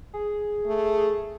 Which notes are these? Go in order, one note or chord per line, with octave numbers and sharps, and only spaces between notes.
G#4
A3